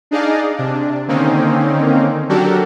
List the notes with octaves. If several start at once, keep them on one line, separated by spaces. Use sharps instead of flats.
D4 D#4 G#4 D5 D#5 F5
C3 D4
D3 D#3 A#3 C4 C#4 D#4
F#3 D4 F#4 G4 A4 A#4